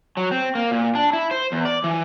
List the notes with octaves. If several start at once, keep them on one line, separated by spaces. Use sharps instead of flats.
F#3
C4
A#3
A#2
D4
E4
C5
E2
D5
E3